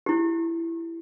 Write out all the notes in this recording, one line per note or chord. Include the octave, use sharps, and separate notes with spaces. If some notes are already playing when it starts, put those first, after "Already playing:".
E4 G4